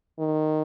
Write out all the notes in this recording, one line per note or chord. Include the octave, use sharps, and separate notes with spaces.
D#3